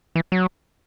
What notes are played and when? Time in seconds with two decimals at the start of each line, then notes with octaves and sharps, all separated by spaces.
0.15 E3
0.32 F#3